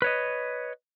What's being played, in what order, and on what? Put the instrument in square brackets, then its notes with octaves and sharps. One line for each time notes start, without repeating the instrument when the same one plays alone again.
[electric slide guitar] B4 C#5 D#5